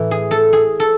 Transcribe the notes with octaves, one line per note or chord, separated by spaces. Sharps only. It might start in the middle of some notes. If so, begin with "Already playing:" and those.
Already playing: A2 E3
G#4
A4
G#4
A4